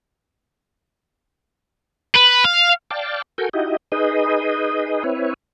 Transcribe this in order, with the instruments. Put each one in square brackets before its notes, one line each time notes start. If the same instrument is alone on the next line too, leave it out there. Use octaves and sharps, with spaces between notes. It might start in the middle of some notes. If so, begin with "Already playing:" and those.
[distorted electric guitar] B4
F5
[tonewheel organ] D5 F5 G5 A5
F#4 A4 A#4 G#5 G6
D#4 E4 F#4 G4 D#5
D#4 G#4 B4 D#5
C4 E4 B4 C#5